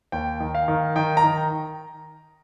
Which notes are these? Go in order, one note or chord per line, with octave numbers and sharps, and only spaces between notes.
D#2 G5
D#3
F5
D#3
D#3 G5
A#5
D#3